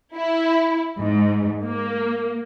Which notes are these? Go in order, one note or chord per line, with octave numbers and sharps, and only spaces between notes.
E4
G#2
A#3